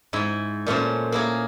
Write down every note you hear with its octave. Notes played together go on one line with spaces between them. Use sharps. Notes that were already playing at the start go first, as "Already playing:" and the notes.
G#2 E4
A#2 A3 C#4 C5
A#3 E4 G#4